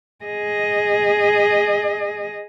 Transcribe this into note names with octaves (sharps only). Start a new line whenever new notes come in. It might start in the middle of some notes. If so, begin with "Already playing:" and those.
G#4 D#5